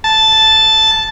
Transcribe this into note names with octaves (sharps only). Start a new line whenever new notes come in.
A5